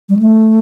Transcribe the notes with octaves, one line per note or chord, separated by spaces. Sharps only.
G3
A3